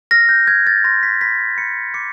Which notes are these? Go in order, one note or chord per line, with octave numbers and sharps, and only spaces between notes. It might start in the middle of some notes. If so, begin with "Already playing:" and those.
F6 A#6
G6
F6 G#6
A6
C6 A#6
B6
B5 B6
B5 C#7
D6 C#7